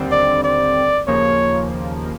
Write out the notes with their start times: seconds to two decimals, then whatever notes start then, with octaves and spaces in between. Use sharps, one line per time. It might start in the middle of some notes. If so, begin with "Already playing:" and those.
Already playing: D#2 D3 G3 C4
0.12 D5
0.44 D5
1.08 D#2 C#3 F3 A#3 C#5